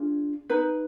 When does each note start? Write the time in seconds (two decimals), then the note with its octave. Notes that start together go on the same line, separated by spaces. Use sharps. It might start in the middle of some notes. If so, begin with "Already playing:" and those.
Already playing: D4 F4 G#4
0.50 D#4 B4